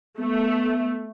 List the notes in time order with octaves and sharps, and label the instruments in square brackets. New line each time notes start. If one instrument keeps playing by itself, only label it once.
[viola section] A3 [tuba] B3